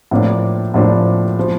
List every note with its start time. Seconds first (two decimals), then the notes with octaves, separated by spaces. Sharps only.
0.11 A2 F3 A#3 D4
0.74 A2 F3 A#3 D4
1.39 F3